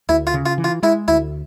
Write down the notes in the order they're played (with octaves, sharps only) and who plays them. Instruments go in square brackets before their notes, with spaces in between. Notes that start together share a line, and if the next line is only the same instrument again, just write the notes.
[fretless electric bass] D2 [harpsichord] E4
[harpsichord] F4
[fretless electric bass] C#3
[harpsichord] F4
[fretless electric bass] E3
[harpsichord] F4
[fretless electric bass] G#3 [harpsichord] E4
[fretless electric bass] D2 [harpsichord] E4